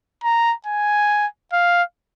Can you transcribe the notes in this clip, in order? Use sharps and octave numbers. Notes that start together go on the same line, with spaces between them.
A#5
G#5
F5